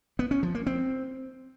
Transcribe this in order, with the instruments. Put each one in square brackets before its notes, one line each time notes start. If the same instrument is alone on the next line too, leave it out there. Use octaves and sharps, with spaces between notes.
[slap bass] B3
C#4
F3
A#3
C4